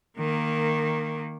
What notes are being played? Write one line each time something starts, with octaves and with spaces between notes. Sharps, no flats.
D#3 A#3